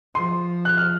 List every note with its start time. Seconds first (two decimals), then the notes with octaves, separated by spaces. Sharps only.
0.15 F3 C6
0.65 F#6
0.77 F6